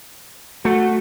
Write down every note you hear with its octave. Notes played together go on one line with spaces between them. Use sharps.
A3 F#4